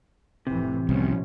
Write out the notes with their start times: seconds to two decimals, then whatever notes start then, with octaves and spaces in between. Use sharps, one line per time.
0.47 F1 A2 C3 E3
0.89 C2 B2 F3 C#4